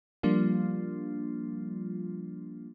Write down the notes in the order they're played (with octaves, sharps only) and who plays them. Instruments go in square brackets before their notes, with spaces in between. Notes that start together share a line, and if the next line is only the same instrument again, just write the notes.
[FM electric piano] F3 G3 A#3 D4 F4